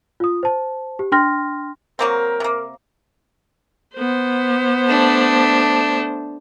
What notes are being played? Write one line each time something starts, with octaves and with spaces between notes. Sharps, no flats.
F4 D#6
C5 A5
G4
D4 G5 C6 F6 A#6
F#3 A#3 C4 A#4
C3 A#3
B3 C5
A3 D4